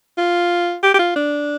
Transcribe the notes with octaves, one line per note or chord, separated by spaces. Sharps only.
F4
G4
G4
F4
D4